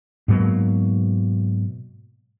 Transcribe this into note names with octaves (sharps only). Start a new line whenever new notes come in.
G#2 B2 F#3 A#3